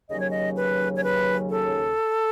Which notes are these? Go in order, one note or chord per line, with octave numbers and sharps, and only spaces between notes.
D#2 C#3 F#3 C#4 D#5
C#5
D#5
B4
C#5
B4
A4